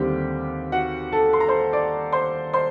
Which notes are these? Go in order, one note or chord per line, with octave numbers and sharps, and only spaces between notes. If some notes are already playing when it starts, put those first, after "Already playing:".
Already playing: D#2 D3 G3 C4 G4
F#4 F#5
A4 A5
C6
A#5
C5 C6
D5 D6
C5 C6
C5 C6